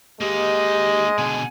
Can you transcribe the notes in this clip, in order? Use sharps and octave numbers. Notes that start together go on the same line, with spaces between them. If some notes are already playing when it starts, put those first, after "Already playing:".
G#3 A#3 D#4 G4 D#5
B2 D3 G#5